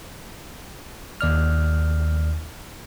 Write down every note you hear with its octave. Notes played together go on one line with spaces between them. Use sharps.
D#2 D5 F6